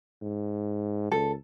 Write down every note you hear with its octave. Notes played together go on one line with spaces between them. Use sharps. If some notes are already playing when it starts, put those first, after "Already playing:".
G#2
C#2 A4